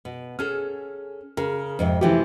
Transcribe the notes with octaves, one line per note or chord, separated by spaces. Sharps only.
B2
C#4 G#4 A4 F6
C#3 A#4
F2 G#2 C3
C3 E3 F3 A3 G4